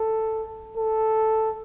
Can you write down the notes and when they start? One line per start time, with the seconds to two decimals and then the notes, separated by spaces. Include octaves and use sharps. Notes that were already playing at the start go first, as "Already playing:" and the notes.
Already playing: A4
0.77 A4